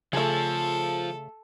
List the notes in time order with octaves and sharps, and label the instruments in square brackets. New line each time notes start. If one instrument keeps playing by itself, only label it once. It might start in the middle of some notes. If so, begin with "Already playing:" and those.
[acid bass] C#3 [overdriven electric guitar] F3 [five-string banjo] A3 G#4 [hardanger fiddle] A4